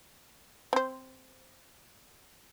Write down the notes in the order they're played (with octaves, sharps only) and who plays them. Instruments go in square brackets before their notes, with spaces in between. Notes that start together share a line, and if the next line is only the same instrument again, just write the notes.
[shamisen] C4 C5